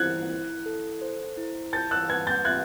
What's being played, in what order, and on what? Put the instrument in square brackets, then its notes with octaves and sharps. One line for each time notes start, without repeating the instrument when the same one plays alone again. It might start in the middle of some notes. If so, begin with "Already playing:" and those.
Already playing: [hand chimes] E4 C5 [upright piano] F#6 G#6
[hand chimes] E4
A4
C5
E4
[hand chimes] A5 [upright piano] G6 A6
[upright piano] E6 F#6
[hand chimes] B4 [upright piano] F#6 G#6
[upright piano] G6 A6
[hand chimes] E5 [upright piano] F#6 G#6